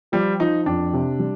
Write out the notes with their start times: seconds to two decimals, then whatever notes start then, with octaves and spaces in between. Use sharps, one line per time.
0.12 F3 G3
0.40 F3 D#4
0.66 F2 D4
0.93 C3
1.19 G3